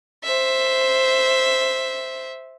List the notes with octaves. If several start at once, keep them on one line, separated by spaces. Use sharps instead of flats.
C5 E5